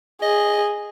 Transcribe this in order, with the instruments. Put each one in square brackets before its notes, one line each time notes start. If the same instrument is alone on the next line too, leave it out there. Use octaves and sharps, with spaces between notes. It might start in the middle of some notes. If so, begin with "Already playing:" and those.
[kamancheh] G#4 [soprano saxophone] D#5